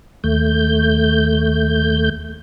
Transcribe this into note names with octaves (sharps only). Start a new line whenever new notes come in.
D#2 A3 G6